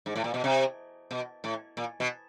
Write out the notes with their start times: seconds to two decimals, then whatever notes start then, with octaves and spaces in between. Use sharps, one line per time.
0.06 G#2
0.16 A2
0.24 A#2
0.34 B2
0.44 C3
1.11 B2
1.44 A2
1.77 A#2
2.00 B2